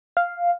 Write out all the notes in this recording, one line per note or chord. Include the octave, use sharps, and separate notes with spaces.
F5